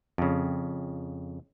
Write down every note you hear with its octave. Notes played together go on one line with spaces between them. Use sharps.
F2 C#3